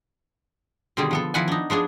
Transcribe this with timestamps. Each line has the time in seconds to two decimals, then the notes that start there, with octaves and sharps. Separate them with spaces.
0.97 B2 D3 D#3 G3 C4 G#4
1.11 F3 B3 A4
1.34 D#3 F3 E4 F#5 G#5
1.48 D4 D#4
1.70 F3 B3 D4 G#4